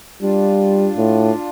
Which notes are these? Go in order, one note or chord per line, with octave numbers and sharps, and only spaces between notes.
G3 D4 F4
A2